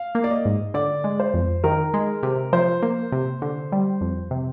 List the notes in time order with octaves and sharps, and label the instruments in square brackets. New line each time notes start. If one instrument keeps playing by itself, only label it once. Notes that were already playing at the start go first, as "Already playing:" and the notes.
Already playing: [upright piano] F5
[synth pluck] A#3
[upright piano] D5
D#5
[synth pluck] G#2
[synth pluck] D3 [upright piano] D5
[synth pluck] G#3
[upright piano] C5
[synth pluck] F2
[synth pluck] D#3 [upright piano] A#4
[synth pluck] G#3
C3
[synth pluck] F3 [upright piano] C5
[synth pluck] A#3
C3
D3
G3
F2
C3